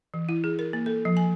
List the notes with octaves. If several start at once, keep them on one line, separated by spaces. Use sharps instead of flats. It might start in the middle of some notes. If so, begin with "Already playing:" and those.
E3
E4
G#4
A#4
A#3
A4
F3
G#5